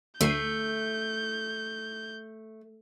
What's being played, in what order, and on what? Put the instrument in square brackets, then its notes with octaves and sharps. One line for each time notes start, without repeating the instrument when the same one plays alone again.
[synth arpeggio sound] D2 C7 D#7 [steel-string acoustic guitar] A3 [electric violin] G6